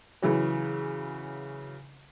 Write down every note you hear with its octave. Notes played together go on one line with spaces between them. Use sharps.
C#3 E3 F#3